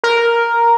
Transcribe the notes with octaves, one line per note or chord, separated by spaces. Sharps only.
A#4